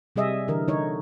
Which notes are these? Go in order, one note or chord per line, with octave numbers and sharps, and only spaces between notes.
C3 G3 G#4 D#5 E5
D3 E3 A#4
D3 D#4 C#5